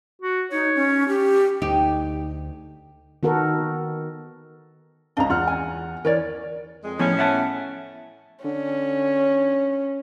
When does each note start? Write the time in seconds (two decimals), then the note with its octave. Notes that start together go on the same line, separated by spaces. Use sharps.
0.22 F#4
0.52 D#4 C#5
0.75 C#4
1.08 G4
1.62 D2 D#4 G4
3.23 D#3 B3 F#4 A4 A#4
5.17 C#2 D4 D#5 F5 A#5
5.30 E2 F4 F#5 F6
5.47 G#5
6.05 E3 A#4 C#5 D5
6.83 F2 G#3
6.99 A2 F3 B3 C#4
7.19 E5 F#5 A5
8.45 D3 C#4